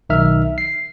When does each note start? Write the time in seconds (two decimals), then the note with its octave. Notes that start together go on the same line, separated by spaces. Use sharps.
0.09 B1 D#3 D#4 E5 F6
0.58 C7